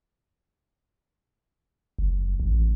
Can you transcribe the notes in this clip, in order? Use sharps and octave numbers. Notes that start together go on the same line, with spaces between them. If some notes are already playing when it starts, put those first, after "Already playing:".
F#1
A1